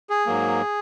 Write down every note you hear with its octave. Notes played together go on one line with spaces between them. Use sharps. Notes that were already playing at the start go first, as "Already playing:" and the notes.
G#4
G#2 F#3 A#3